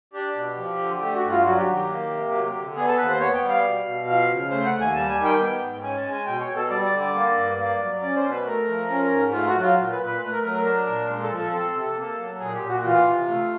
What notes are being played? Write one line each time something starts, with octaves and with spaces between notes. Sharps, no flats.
D4 G4
B2
F3
D3
A3 G4
F#4
G2
F4
F#3 F#4
G4
D#3
G4
A#3
C3
F#3
D3
B3 G#4
A4
D#2 B4
C5
B3 C#5
G5
G3
F5
B2
B2
F3 F5
C#3
A3 C5
F#5
D#2
G#5
G3 A5
G#5
D#3
G5
B3
G#2
C#4 G#5
A5
G#3
G#5
B2 G5
C#5
B2
A4
G3 D5
D5
D3
D5
A#3
G2
A#3
F#3
C#4 D5
C5
B2
B4
A3 A#4
F3
C#4
G#2
A3 F4
F#4
F#3
F4
A#2
B4
A#2
B4
A3 B4
A#4
F#3 A#4
A#4
D4
A#2
G#3
A4
F3
A4
C4 A4
C3
A#3
F#3
A#2 G#4
G4
A#2
F#4
E3 F4
C3
A3